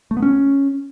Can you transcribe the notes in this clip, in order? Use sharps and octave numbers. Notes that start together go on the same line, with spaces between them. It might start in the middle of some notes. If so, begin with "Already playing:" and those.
A3
B3
C#4